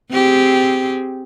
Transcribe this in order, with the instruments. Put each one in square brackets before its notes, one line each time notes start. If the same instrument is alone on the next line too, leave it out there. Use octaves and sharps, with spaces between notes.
[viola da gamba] C4 G4 G#4